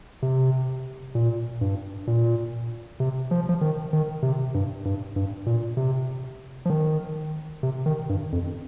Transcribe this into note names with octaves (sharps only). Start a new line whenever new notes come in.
C3
A#2
G2
A#2
C3
F3
F3
D#3
D#3
C3
G2
G2
G2
A#2
C3
F3
D#3
C3
D#3
G2
F2